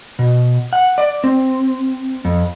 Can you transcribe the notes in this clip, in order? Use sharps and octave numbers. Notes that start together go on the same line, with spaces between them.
B2
F#5
D5
C4
F2